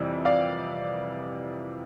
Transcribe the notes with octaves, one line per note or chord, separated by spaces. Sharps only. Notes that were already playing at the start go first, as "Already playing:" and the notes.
Already playing: F2 C3 E3 G3
D5 F5